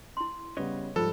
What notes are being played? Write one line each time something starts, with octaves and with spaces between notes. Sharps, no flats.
E4 C6
C#3 G3 B3 B4 C#5 D#5
G#2 F3 G3 F4 A4 C5